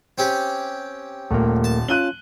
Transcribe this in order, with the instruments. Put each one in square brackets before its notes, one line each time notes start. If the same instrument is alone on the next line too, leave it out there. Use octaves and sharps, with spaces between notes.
[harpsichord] C4 C#4 G4
[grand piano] D#1 [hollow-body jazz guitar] A3 A#3
[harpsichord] A5
[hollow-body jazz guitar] C#4 F4 [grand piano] F#6 D#7 G7